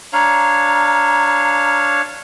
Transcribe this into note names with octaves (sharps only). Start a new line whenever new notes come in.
D4 C#5 F5 A#5